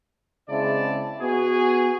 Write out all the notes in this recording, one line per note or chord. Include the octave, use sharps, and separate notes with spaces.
C#3 G#3 C4 E4 D5 A5
B3 F#4 G#4